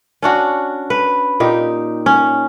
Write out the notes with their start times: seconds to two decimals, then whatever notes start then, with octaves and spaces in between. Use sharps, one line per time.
0.23 C#4 D4 F#4
0.90 B4
1.40 A#2 D#4 G4
2.06 C#4